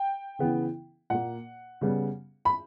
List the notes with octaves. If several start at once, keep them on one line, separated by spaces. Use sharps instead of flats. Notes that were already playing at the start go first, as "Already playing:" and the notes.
Already playing: G5
C#3 E3 B3
A#2 A#3 F#5
C#3 G3 B3
B5